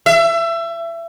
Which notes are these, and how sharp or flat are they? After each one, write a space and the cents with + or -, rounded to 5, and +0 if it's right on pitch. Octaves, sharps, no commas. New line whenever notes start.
E5 +25